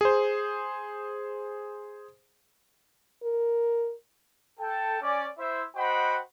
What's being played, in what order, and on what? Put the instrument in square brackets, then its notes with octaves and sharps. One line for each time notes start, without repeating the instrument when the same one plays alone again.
[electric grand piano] G#4 C5
[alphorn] A#4
[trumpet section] A4 G5 A5
C#4 D5
E4 C5 E5
F#4 C5 D#5 F#5 G5 B5